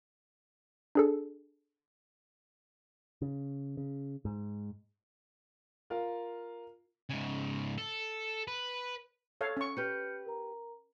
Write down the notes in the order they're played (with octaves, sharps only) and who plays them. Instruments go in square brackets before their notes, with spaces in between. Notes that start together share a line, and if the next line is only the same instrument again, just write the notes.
[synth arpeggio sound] D4 G#4 A4
[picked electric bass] C#3
C#3
G#2
[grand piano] F4 A#4 F5
[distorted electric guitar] G#2 C#3
A4
B4
[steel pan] A4 C#5 F5
C#4 C#6
[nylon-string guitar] G4 B4 [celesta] F6 G6 C#7
[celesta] A#4 A#5